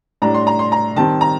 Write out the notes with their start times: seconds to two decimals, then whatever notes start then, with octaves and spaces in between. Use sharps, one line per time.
0.22 A2 G3 D4 A#5
0.34 C6
0.47 A#5
0.59 C6
0.72 A#5
0.96 D#3 G3 C4 A5
1.21 A#5